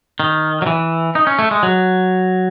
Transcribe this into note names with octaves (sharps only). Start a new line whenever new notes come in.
D#3
F#3
E3
D#4
C#4
A3
G#3
F#3